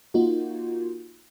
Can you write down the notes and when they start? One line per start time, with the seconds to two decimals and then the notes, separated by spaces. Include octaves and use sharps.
0.14 A#3 D#4 F4 F#4